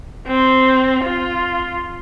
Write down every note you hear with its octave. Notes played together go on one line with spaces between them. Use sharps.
C4
F4